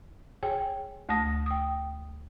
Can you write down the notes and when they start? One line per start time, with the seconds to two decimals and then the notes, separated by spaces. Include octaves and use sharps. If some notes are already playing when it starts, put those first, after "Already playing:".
0.43 G#4 C#5 G5 G#5
1.09 D2 A3 A5 D#6 A#6
1.46 G5 D#6